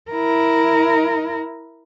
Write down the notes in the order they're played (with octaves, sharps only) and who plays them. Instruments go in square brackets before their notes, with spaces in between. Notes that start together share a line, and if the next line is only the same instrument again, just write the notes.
[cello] E4 A#4